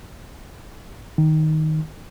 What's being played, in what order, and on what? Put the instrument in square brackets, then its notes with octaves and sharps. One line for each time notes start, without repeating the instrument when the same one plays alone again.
[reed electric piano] D#3